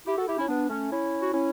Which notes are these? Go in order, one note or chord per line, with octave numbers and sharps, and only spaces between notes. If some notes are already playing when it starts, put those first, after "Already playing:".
E4 G4
F#4 A4
E4 G4
C#4 E4
B3 D4
A3 C#4
C#4 E4
F#4
C#4 E4